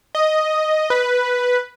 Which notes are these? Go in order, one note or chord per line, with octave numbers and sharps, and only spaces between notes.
D#5
B4